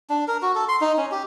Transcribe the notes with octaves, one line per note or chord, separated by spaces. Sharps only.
D4
A#4
F#4
A4
C6
D#4
C#4
G4